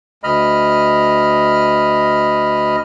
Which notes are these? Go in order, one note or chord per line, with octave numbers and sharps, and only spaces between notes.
D2 D#5 B5 F6